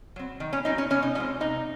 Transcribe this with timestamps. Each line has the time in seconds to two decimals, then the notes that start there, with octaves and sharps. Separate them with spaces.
0.16 F#3 C4
0.40 D#3
0.53 C#4
0.65 F#3 C4 D#4
0.78 C#4
0.90 C3 C#4
1.03 D#4
1.15 F3 C#4
1.18 G#3 C4
1.40 C3 D#4